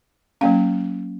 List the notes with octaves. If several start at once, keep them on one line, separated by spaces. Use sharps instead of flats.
F#3 A#3 C#4 F5